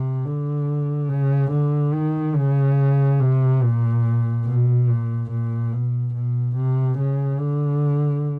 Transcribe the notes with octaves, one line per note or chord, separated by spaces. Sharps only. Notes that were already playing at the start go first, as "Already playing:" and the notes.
Already playing: C3
D3
C#3
D3
D#3
C#3
C3
A#2
B2
A#2
A#2
B2
B2
C3
C#3
D3